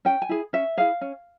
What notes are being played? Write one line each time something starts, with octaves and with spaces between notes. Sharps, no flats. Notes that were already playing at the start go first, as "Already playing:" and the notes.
C#4 G5
G#5
E4 G#4
C#4 E5
E4 G#4 F5
C#4